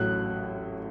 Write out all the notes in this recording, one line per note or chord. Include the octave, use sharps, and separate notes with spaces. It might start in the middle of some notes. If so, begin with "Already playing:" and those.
Already playing: A1 A2 F#3 F#6